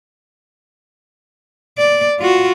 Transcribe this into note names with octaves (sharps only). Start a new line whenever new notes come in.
D5
F4 F#4